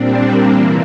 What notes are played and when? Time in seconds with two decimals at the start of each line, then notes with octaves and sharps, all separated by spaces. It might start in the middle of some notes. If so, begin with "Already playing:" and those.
Already playing: A#2 G3 C4 D4
0.21 A#3
0.52 C3 E3 A#3